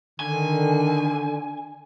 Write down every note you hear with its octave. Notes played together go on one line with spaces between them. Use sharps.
D3 D#3 G#5